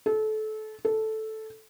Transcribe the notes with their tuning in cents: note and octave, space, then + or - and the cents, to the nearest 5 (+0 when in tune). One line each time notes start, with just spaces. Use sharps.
A4 -25
A4 -5